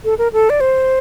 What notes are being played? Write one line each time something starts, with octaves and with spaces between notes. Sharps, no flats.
A4
A#4
A4
D5
C5